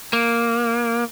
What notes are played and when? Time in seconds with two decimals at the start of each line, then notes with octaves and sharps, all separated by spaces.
0.13 A#3